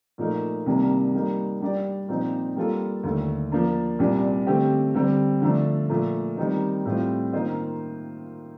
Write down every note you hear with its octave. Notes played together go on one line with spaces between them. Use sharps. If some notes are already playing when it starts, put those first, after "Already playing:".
A#2 F3 A3 D#4 A#4
C2 C3 D#3 G3 A#3
G3 A#3 D#4 A#4
G3 D4 G4 D5
A#2 F3 C4 D#4
G3 A#3 F4 A4
D#2 D3 A3
F3 A#3 D4
C2 A#2 G3 D4
D3 A3 C4 G4
D3 G3 C4
D3 F3 A3 D4
A#2 F3 A3
D#3 G3 C4 D#4
A2 G3 C4 F4
D#3 A#3 F4 C5 D#5